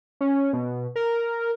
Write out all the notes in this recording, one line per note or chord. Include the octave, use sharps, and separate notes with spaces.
C#4
B2
A#4